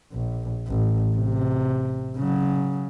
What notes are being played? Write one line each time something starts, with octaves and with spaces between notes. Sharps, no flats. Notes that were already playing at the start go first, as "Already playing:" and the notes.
A#1
A1
C3
C#3 F#3